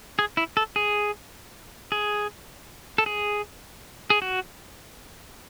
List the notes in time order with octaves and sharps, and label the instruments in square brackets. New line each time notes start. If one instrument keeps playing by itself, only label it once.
[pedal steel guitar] G#4
E4
A4
G#4
G#4
A4
G#4
G#4
F#4